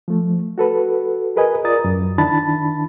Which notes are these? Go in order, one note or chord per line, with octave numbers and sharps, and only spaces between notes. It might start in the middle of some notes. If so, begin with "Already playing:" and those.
F3 A3
F#4 A4 B4
G#4 A#4 B4 D#5 G#5
F4 A#4 D5 A#5 D#6 A6
F#2
D#3 D4 E4 A5 B5 A6